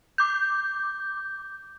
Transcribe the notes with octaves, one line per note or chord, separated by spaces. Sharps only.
D6 G6